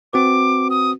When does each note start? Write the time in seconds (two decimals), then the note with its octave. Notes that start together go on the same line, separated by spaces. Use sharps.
0.13 C4 F#4 B4 D6
0.70 D#6